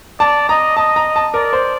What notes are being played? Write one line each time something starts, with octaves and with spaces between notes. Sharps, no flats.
D5 A5
D#5 A#5
D#5 A5
A#5
A5
A#4 D5
C5